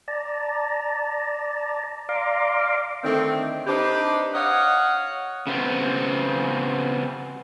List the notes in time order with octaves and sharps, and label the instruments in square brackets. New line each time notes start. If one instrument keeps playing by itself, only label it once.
[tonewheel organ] D5 A5 A#5
D5 F5 A#5 C6 D6
[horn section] D3 D#3 A3 C4
C4 D4 D#4 G4 B4 C5
C#5 D#5 F5 F#5
[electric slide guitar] C#3 B3 C4